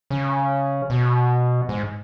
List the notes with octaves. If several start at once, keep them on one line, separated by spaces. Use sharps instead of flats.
C#3
B2
G#2